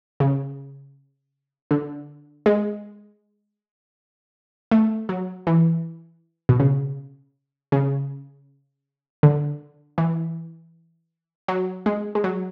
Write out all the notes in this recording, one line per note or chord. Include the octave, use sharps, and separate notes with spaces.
C#3
D3
G#3
A3
F#3
E3
B2
C#3
C#3
D3
E3
F#3
G#3
G#3
F#3